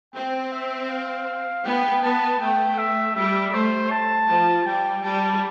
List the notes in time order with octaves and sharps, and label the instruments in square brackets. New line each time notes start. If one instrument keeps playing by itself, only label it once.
[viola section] C4 [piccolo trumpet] G5
[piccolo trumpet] E5
F5
[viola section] B3 [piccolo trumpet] G5
[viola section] B3 [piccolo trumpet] A5
[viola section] A3 [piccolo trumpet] G5
[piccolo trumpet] E5
[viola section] G3 [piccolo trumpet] E5
[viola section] A3 [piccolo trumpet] C5
[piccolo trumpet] A5
[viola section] F3
[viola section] G3 [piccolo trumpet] G5
[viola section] G3 [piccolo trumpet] A5